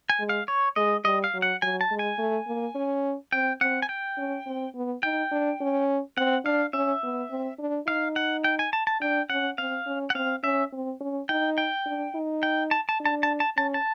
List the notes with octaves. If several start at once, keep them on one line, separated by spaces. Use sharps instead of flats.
G#5
G#3
F5
C#5
G#3 D#5
G3 D#5
F5
F#3
F#5
F#3 G#5
A5
G#3
G#5
A3
A#3
C#4
C4 G5
C4 F#5
G#5
G5
C#4
C4
B3
D#4 G5
D4
C#4
C4 F#5
D4 F5
C#4 E5
B3
C4
D4
D#4 F5
F#5
G5
G#5
A5
A5
D4 G5
C#4 F#5
C4 F5
C#4
F#5
C4 F5
C#4 E5
C4
C#4
D#4 G5
G5
D4
D#4
G5
A5
A5
D4
A5
A5
A5
C#4 A5
A5